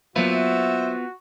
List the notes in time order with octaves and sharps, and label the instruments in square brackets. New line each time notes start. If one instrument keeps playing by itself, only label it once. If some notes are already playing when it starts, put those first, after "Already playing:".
[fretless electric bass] F#3 A#3 [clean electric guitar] B3 F4 B4 [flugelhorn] F#4 [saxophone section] C5 E5